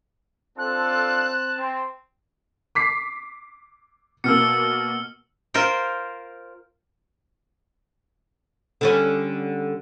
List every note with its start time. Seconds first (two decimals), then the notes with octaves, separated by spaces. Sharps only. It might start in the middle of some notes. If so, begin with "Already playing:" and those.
0.58 C4 D4 F4 A4 A5 F#6
1.57 C4
2.75 D6 B6 C7
4.24 B2 A#3 E6 F6 C#7
5.54 F4 A#4 C5 G5
8.81 D3 G3 C#4 A4